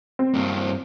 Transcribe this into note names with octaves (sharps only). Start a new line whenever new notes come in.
C4
G2 A#3